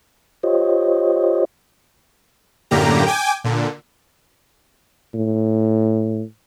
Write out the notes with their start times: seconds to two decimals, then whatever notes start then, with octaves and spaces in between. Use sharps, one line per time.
0.43 F4 G4 C5 C#5 D#5
2.71 F#2 A2 D3 A#3 G4 A#5
3.06 G5 G#5 D6
3.44 A#2 D3
5.14 A2